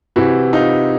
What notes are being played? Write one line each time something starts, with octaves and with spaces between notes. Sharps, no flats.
C3 E3 E4 F#4
D#4 F4